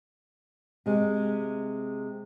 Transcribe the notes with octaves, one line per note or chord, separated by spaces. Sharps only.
C3 G#3